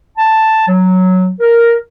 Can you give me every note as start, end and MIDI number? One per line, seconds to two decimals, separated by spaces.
0.17 0.65 81
0.68 1.32 54
1.40 1.76 70